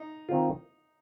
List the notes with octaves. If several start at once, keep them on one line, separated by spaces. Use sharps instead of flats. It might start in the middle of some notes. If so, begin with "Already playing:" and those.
Already playing: D#4
D#3 C4 F4